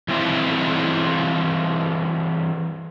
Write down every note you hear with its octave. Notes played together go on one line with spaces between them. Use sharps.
E3 G3 C4 E4 F4